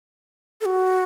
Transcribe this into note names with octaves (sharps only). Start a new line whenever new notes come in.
A4
F#4